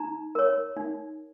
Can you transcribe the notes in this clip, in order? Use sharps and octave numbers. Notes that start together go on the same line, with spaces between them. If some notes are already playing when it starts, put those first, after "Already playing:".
Already playing: D#4 A#5
A#4 C#5
D#4